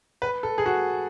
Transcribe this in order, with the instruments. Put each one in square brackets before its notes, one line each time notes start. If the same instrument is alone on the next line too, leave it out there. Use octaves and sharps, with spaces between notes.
[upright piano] B4
A4
G#4
F#4